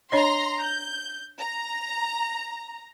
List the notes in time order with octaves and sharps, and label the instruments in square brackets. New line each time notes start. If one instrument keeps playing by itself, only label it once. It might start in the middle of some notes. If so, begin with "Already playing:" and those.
[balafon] D4 C#5 D#5 [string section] A#5 C6
[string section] G6
A#5